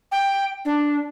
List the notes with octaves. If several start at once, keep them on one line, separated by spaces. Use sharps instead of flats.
G5
D4